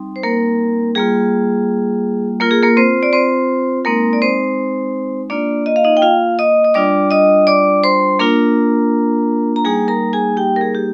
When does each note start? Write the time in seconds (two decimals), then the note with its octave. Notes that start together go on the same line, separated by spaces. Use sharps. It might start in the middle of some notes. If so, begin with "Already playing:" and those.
Already playing: G3 C4 D#4
0.16 C5
0.23 A#3 A#4
0.95 G3 A#3 F4 G#4
2.40 A#3 F4 A#4
2.51 G#4
2.63 A#3 A#4
2.77 C4 C5
3.03 D5
3.13 C4 C5
3.85 G#3 A#3 C4 D#4 A#4
4.13 D5
4.22 C4 C5
5.30 A#3 D4 F4 D5
5.66 D#5
5.76 F5
5.84 D#4 D#5
5.97 G5
6.02 F4 F5
6.39 D#5 D#6
6.64 D#6
6.74 G3 D4 F4 D5 D6
7.11 D#5 D#6
7.47 D5 D6
7.83 C5 C6
8.20 A#3 D4 F4 A#4 A#5
9.56 A#5
9.65 G3 A#3 D#4 G#4 G#5
9.88 A#4 A#5
10.13 G#4 G#5
10.37 G4 G5
10.56 A#4
10.61 G#4
10.74 G4